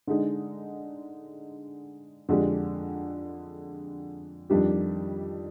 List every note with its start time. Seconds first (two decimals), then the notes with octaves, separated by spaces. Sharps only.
0.07 D3 G#3 D#4
2.29 F2 D3 G#3 D4 G4
4.50 F2 D#3 G3 D4 G4